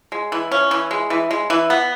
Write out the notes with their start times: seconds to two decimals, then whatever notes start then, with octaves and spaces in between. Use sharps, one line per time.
0.12 G#3
0.32 E3
0.52 C#4
0.71 E3
0.91 G#3
1.10 E3
1.31 G#3
1.50 E3
1.70 B3